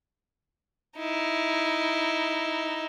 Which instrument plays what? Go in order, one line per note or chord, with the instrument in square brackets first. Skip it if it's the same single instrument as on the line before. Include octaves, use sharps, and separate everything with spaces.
[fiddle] D#4 E4